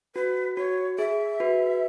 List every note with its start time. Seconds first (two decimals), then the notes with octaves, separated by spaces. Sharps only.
0.15 F#4 B4
0.57 F#4 C#5
0.99 G#4 E5
1.40 F#4 B4